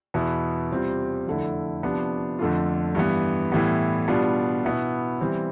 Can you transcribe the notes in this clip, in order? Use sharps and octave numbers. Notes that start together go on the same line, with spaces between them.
E2 B2 B3 E4
C3 G3 C4 F4
F2 D3 A3 E4
C3 F3 B3 D4
F2 D3 A3 D4 F4
G2 E3 B3
A2 E3 G3 B3
B2 G3 B3 D4 F4
B2 B3 E4
E3 G3 C4